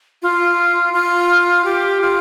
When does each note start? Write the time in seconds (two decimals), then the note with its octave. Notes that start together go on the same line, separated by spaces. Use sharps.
0.23 F4
0.93 F4
1.65 G4
2.01 F4